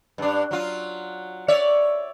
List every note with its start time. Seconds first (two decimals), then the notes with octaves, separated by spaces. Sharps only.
0.18 G2 D4
0.51 F#3 F4
1.48 C#5 D5 E5